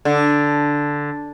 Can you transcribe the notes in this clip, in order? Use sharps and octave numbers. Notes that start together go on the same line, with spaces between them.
D3